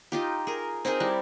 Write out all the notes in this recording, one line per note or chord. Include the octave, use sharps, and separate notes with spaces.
D#4 F4 G4
G#4 A#4
C4 D#4 G#4 A#4
G3 E4 D5